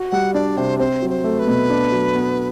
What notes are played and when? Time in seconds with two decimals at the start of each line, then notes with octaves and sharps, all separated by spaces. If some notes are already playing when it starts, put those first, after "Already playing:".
Already playing: F#4
0.11 G3 F#5
0.34 D4 D5
0.57 C3 C5
0.79 C4 C5
1.02 F#3
1.10 C5
1.24 A3
1.39 B4
1.47 B2
1.70 D4
1.92 F#3
2.15 B3